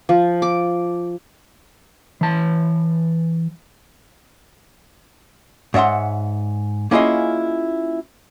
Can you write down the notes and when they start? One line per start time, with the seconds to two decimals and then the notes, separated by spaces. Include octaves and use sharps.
0.09 F3
0.42 D6
2.21 E3 A5
5.74 G#2 C#5 E5 F#5 C6
6.91 A#3 C#4 E4 F4 G#4 D#5